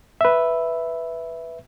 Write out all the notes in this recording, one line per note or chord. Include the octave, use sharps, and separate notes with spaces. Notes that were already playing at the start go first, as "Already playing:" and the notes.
B4 E5